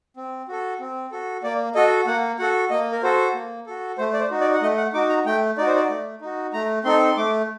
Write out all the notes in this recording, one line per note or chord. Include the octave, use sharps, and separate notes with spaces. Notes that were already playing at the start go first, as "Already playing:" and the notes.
C4
F#4 A4
C4
F#4 A4
A#3 D5
F#4 A4 D#5
A#3 F#5
F#4 A4 F#5
A#3 D#5
A#4
F#4 A4 C5
A#3
F#4 A4
A3 C5
D5
C5
D#4 F#4
D5
F#5
A3 D#5
F#5
D#4 F#4 D6
A#5
A3 G5
D#4 F#4 D5
C5
D5
A3
D#4 F#4
A3 A#5
C4 D#4 A4 C6
C6
A3 D6